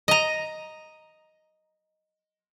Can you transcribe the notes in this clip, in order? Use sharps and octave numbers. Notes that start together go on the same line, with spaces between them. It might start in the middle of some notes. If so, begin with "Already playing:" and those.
D#5 A#5